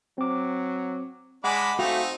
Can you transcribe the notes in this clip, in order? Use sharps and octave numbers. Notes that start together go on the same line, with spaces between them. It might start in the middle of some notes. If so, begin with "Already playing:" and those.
F#3 C4 D6
G#3 D4 F#5 G#5 B5 D6
A3 C4 D#4 F#4 F5 G5